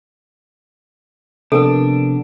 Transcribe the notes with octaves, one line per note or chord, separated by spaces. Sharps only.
C3 F3 B3 D4 A4 A#4